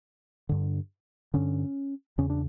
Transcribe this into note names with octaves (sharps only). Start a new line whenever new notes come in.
G2 D3
G2 D3 C#4
E2 C#3 C#4
D4